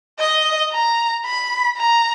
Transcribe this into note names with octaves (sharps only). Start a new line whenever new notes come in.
D#5
A#5
B5
A#5